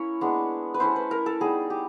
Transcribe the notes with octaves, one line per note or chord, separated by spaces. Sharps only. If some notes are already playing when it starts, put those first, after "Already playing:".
Already playing: A#3 C#4 E4 C#5
G#3 B3 D4
B4
A3 C#4 E4 C5
B4
A#4
A4
G3 B3 D#4 G#4
G4